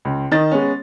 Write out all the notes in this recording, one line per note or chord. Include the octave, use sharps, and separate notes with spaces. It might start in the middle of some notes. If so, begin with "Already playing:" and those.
C#2
D#3 D#5 A6
G#3 B3 C#4